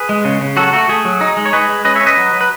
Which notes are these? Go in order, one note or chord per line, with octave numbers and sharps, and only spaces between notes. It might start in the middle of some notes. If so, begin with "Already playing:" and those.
Already playing: G#4 B4
G#3
C#3
C#3
F#3 F#4 A4
A3 F#4
A3 G#4
F#3
D#4
G#3
C#5
G#3 G#4 B4
G#3
C#4 B4 D#5
C#5 E5
C#4
B4 D#5
F#3
F#3
B4